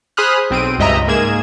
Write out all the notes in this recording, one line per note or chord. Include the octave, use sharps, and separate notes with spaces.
G#4 C5 B5 D#6 F6 F#6
B1 C4 D7 D#7
C#2 G2 D#5 E5 A#5
G#2 A#3 G#4 G#6 E7